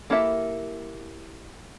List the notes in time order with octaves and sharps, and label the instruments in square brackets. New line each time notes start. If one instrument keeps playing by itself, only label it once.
[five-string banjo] A#3 E4 G4 A4 E5